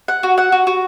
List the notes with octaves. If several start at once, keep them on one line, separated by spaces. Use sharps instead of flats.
F#5
F#4
F#5
F#4
F#4